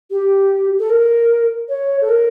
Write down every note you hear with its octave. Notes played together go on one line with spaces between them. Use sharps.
G4
A4
A#4
C#5
A4
A#4